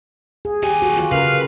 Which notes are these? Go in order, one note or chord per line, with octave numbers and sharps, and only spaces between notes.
G#4
D#2 G4 G#5
F#4
F4
C#3 A#4 B4 F5